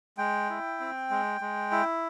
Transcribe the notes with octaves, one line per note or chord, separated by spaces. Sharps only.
G#3 G5
E4
C4
G#3
G#3
E4